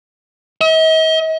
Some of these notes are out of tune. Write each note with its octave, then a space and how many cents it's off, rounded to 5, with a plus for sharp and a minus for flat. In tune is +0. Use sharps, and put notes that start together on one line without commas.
D#5 +45